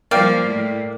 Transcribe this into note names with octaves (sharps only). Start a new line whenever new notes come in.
F3 G3 A#3 D5 F5 G5
A2